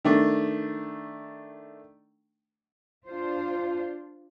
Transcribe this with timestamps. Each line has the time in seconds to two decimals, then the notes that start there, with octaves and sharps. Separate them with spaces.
0.05 D#3 A3 D4
3.08 D4 F4 C5